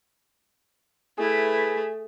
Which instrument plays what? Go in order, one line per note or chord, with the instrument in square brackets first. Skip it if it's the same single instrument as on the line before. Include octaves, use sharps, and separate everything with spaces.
[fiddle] A3 [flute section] E4 B4 [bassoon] G#4